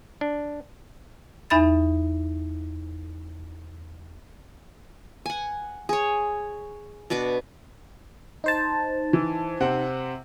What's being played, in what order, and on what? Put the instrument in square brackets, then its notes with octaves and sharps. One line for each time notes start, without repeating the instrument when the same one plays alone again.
[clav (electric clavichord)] D4
[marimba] E2 D#4 E5 B5 A6
[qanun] F#5 G#5
G#4 C#5
B2 D4 B4 D6
[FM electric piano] D#4 C5 A5
[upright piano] E3
C3 C4 F#5